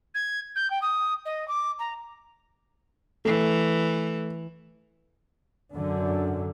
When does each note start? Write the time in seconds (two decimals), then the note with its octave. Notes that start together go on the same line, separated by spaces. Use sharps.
0.14 G#6
0.55 G6
0.70 G5
0.81 D#6
1.25 D#5
1.48 D6
1.79 A#5
3.25 E3 A3
5.74 F#2 D3